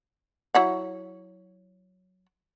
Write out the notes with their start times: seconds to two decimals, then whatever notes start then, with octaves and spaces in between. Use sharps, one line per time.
0.54 F#3 E4 F#5